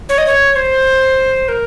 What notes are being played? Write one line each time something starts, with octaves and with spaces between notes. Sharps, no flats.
C#5
D#5
C#5
C5
A#4